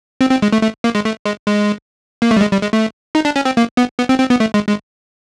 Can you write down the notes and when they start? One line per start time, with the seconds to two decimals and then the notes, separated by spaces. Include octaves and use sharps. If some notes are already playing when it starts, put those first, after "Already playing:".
0.21 C4
0.31 C4
0.42 G#3
0.53 A3
0.63 A3
0.84 A#3
0.95 G#3
1.05 A3
1.25 G#3
1.47 G#3
2.22 A#3
2.31 A3
2.37 G3
2.41 G#3
2.52 G3
2.62 G#3
2.73 A3
3.15 D#4
3.25 D4
3.36 C#4
3.45 C4
3.57 A#3
3.77 B3
3.98 B3
4.09 C4
4.20 C4
4.30 B3
4.40 A3
4.54 G#3
4.69 G#3